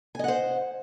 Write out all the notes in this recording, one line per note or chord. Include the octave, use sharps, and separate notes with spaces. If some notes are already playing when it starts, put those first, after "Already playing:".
C5 D#5 F#5 G#5